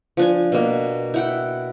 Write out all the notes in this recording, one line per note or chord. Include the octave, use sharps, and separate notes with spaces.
F3 D4 G#5
B2 A#3
E4 F#5 G5